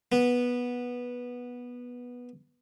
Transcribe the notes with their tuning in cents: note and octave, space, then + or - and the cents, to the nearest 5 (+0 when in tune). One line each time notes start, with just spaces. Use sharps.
B3 -10